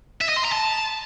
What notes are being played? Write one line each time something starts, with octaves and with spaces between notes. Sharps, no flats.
E5
D#5
C6
A#5
A5